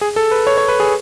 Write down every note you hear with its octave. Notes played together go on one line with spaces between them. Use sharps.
G#4
A4
B4
C#5
C#5
B4
G#4